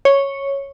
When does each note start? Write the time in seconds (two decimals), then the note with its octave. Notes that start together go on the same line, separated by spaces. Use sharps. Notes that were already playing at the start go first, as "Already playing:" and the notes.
0.05 C#5